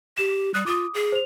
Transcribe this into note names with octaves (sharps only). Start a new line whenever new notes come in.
G4 E7
G3 D#6 F#6
F4 D6 D#6
G#4
C5 F7